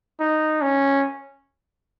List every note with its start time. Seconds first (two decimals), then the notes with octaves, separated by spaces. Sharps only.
0.20 D#4
0.62 C#4